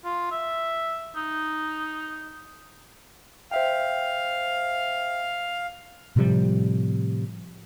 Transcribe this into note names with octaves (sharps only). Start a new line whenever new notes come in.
F4
E5
D#4
C5 E5 F5 G5
A2 C3 F3 G3